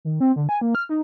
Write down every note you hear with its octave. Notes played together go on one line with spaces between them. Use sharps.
D#3
C4
D3
G#5
A#3
F6
D#4